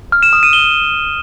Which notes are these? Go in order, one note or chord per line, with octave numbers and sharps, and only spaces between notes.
F6
E7
D#6
D#7
G7